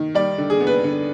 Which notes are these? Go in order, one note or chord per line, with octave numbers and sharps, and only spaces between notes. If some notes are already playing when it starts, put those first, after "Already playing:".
Already playing: D#3
G3 D5
D3
G#4
B3
B4
D3